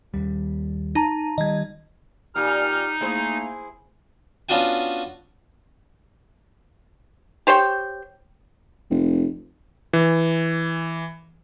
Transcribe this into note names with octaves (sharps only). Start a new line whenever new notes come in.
D#2 G3
D#4 A5 A#5
D#3 G3 D#5 G#6
A#2 D#4 G4 F6
A3 A#3 E4 G#4 C5
B3 C#4 D4 F4 F#4 G#5
G4 C5 C#5 G5
F1
E3